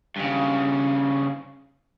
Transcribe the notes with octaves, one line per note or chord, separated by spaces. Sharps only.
G2 C#3